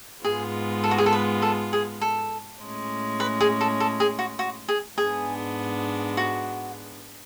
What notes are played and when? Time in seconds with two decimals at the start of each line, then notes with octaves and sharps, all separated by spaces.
0.24 G#2 G#3 B3 F4 G#4
0.84 A4
0.91 F#4
0.98 G#4
1.06 A4
1.13 B4
1.42 A4
1.73 G#4
2.01 A4
2.61 A2 G#3 C#4
3.20 B4
3.41 G#4
3.61 A4
3.80 A4
4.00 G#4
4.19 F#4
4.39 F#4
4.69 G#4
4.98 G#2 G#3 B3 D4 G#4
6.17 F#4